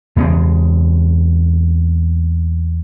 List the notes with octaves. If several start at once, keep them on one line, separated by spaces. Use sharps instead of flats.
E2 G#3 A3 C4